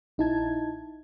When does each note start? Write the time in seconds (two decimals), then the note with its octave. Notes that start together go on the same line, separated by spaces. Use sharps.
0.18 A#1 D#4 E4 A5 G#6